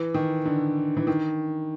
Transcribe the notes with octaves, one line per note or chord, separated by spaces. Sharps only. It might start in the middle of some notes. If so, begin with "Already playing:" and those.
Already playing: E3
D#3
D3
E3
D#3